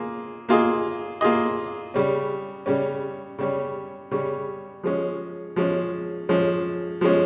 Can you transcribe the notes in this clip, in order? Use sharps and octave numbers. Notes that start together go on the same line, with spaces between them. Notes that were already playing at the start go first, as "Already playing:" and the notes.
Already playing: A#3 F4 G#4
A#3 F4 G#4 D#5
A#3 F4 G#4 D#5
C#3 G3 C#4
C#3 G3 C#4
C#3 G3 C#4
C#3 G3 C#4
F3 G#3 C#4
F3 G#3 C#4
F3 G#3 C#4
F3 G#3 C#4